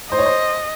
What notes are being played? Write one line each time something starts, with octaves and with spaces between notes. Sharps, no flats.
C5 D#5
C#5
C5